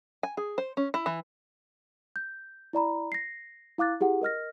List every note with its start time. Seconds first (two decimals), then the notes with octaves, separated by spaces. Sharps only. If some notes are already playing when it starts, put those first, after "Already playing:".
0.23 G#5
0.37 G#4
0.58 C5
0.77 C#4
0.94 E4
1.06 E3
2.16 G6
2.73 E4 D5 A#5 B5
3.12 A#6 C7
3.78 E4 F5 D6 F#6 A6
4.00 E4 G4 G#4 F#5
4.21 A#4 D#5 F6 A#6